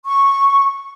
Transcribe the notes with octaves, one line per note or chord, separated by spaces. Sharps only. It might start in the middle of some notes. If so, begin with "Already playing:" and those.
C#6